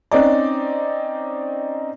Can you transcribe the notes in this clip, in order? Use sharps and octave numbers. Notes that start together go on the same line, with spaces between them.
C4 C#4 D#4 D5